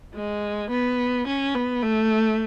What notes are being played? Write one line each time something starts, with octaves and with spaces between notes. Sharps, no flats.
G#3
B3
C#4
B3
A3